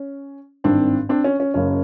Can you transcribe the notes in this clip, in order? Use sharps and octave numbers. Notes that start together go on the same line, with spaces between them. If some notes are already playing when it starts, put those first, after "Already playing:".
Already playing: C#4
G#1 G2 D#3 C4 D4
C4 D4
C#4
C#4
F#1 F#2 C#3 C#4